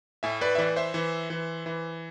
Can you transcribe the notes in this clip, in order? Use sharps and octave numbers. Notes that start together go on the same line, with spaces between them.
A2 E5 G#5
B4 D5
E5
E3 B4 D5
C5 E5
E3
E3
E3